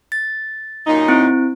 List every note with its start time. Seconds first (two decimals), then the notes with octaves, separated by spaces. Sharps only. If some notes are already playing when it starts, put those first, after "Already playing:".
0.12 A6
0.87 F#2 A#2 D#4
1.08 C4 E4